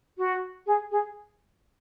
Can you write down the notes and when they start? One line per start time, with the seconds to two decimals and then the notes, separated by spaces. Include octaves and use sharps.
0.18 F#4
0.66 G#4
0.91 G#4